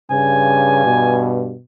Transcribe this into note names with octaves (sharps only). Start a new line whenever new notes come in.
G2 C#3 G#5
B2